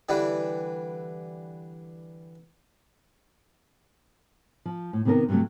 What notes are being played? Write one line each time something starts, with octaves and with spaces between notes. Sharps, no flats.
D3 E3 G3
F3
A2
C3 D#3 B3 A4 A#4
G2 C3 F#3 A3